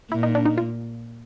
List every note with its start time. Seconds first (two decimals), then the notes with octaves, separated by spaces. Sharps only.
0.11 A#2 E4
0.23 D#4
0.35 D4
0.45 D#4
0.58 F4